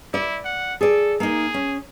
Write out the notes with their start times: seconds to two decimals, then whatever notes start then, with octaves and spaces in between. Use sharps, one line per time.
0.14 E4 D5
0.45 F#5
0.81 G#4 A4 D5
1.20 A#3 D#4 G#4
1.54 C#4